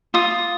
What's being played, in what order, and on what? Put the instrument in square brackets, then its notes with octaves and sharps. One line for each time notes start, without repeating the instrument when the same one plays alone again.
[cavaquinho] F4 D#6